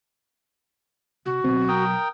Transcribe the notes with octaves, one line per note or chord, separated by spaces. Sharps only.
C3 F#4
B2 F#3 C4
A#4 G5 D#6